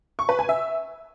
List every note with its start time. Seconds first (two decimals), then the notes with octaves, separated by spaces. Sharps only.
0.19 C#6
0.29 B4
0.39 G#5
0.49 E5